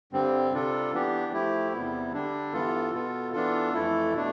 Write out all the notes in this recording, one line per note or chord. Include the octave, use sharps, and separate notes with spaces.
G2 D3 G3 C4
C3 G3 D4 F4 A4
E3 B3 D4 G4
F3 A3 E4 G4
E2 C3 G3 B3 E4
D3 G3 D4
G2 E3 B3 F4 A4
B2 B3 F4 A4
E3 B3 D4 F4 A4
F2 E3 A3 E4 A4
B2 A3 D4